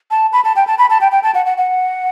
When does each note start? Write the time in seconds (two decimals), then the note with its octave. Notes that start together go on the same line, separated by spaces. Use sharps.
0.11 A5
0.33 B5
0.45 A5
0.56 G5
0.67 A5
0.78 B5
0.90 A5
1.01 G5
1.12 G5
1.23 A5
1.34 F#5
1.46 F#5
1.58 F#5